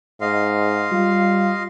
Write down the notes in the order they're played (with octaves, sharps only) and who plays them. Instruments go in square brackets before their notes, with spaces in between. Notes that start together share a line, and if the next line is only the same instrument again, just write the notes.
[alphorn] G#2 [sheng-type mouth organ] D#5 F5 C6
[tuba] G3 [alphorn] F4